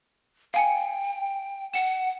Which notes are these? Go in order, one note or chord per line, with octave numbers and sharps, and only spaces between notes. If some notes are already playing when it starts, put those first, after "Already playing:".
F5 G5 G#5 C#7
F#5 C#7 E7